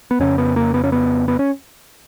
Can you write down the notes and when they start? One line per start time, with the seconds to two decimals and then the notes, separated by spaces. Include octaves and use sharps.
0.11 B3
0.19 F2 C#3 C#4
0.38 B3
0.56 A#3
0.74 B3
0.84 C#4
0.92 B3
1.28 B3
1.39 C#4